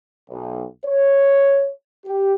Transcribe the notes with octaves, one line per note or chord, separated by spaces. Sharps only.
B1
C#5
G4